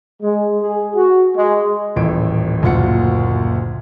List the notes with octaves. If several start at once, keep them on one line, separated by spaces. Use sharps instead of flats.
G#3
G#4
F#4
G#3
D#1 A1 A2 D7
F#1 D2 A#2 F4 F#5 C#7